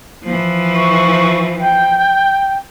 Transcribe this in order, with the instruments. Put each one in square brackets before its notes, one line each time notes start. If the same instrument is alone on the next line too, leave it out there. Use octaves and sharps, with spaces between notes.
[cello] E3 F3
[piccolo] C#6
G5